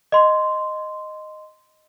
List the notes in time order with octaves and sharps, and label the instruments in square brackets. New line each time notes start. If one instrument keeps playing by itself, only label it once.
[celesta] D#5 C6